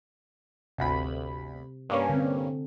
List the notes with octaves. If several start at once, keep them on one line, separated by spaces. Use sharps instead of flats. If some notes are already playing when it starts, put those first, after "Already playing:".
G1 D2 C3 B5
G2 A#3 C#4
D3 C4